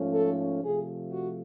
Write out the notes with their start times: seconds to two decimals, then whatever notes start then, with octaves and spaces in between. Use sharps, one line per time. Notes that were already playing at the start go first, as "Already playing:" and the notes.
Already playing: G#2 F3 A3 C#4
0.12 A4
0.62 C3 F3 A3 G#4
1.11 F#4